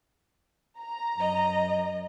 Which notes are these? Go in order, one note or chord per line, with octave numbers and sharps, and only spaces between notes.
A#5
F#2 D#5